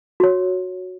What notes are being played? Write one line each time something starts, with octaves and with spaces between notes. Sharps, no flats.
F#4 C#5